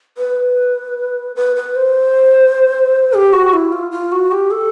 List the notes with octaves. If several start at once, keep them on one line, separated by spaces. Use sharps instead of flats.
B4
B4
B4
C5
G4
F#4
E4
F4
F4
F#4
G4
A4